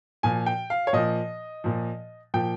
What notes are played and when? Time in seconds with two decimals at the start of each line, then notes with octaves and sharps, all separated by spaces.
0.23 A#2 F3 G#5
0.46 G5
0.70 F5
0.87 C#5
0.93 A#2 F3 D#5
1.64 A#2 F3
2.34 A#2 F3 G5